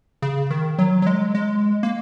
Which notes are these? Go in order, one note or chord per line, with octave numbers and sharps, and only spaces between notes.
C#3
D#3
F#3
F#3
G#3
G#3
A#3